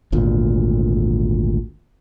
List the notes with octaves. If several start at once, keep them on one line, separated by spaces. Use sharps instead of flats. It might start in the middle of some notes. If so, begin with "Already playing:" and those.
G#1 D2 A#2